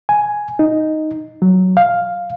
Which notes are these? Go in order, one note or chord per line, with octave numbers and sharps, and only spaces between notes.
G#5
D#4
F#3
F5